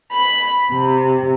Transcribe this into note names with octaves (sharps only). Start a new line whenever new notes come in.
B5
C3